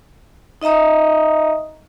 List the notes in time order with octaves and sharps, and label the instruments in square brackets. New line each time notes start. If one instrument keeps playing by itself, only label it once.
[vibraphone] D#4 D#5 E5 A#5 D#6